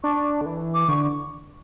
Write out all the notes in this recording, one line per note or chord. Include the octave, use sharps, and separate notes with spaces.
D4 C#6
D3
E3
D6
D3 C#6